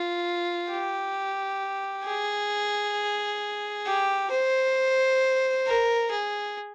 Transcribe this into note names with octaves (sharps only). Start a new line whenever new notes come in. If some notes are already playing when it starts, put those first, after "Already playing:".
Already playing: F4
G4
G#4
G4
C5
A#4
G#4